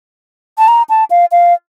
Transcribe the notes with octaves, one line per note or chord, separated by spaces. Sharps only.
A5
A#5
A5
F5
F5